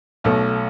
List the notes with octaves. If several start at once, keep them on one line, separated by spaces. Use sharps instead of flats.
B1 B2 A3